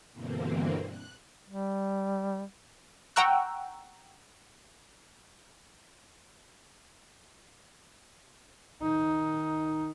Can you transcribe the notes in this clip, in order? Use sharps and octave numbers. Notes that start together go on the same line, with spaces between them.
G2 B2 D3 E3 A#3 C4
F#6
G3
F#5 G5 A#5 C#6 E6 F#6
D#3 D#4